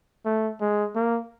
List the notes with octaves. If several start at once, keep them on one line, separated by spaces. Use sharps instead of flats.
A3
G#3
A#3